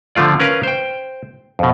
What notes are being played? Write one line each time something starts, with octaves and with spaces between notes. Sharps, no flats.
D3 F3 A3 F4 D5
C#4 A#4 B4 F5
C5 G5
F2 B2